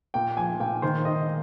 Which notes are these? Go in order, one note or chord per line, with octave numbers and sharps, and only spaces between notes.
A#2 G5
F3 G#5
A#2 G5
D#3 C5
D#3 D#5